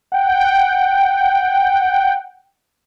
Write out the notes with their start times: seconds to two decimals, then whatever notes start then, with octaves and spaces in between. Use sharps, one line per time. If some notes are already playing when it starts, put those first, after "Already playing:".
0.12 F#5 G5